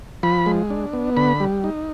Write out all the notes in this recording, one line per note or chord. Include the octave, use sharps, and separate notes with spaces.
F3 B5
G#3
D4
B3
D3 B5
G3
D#4